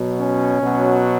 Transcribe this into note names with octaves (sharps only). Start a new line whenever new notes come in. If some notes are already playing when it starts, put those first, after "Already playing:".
Already playing: B2 F#3
C#4
B2 F#3